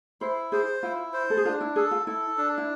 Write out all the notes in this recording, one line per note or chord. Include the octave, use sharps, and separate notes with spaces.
E4 C5
G#4 C5
E4 F4
C5
A4
G#4
D4 F4
E4
G#4 A4
F4
E4 A4
D4
E4